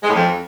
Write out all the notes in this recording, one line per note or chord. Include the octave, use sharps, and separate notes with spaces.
G#3
A2
F2